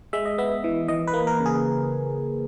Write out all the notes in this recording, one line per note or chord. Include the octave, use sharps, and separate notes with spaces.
G#3 E5
D#5
B3 E5
E3
E3 D#5
B4
A#3
A#4
C#3
G#4